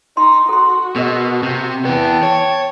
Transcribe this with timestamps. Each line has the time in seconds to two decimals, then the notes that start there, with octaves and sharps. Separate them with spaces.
0.17 D#4 C6
0.49 F#4 A4 C6
0.96 B2 G#4 A#4 D#5
1.43 C3
1.85 E3 B3 G5 A5
2.23 C#5